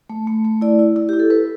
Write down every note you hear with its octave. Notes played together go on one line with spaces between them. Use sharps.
A3
A3
A3
E4 D5
E4
E4
E4 G4
A4
E4 B4